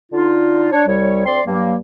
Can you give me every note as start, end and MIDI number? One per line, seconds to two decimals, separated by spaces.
0.12 0.69 50
0.12 0.69 63
0.12 0.69 65
0.71 0.85 62
0.71 0.85 73
0.86 1.22 36
0.86 1.22 55
0.86 1.22 73
1.25 1.40 38
1.25 1.40 60
1.25 1.40 74
1.25 1.40 84
1.46 1.75 43
1.46 1.75 54
1.46 1.75 58